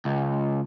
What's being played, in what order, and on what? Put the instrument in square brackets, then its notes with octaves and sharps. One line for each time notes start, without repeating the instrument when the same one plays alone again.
[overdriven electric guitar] C#2